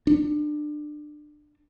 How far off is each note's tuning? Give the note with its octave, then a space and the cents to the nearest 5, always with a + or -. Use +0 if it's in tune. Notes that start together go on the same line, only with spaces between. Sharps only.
D4 +25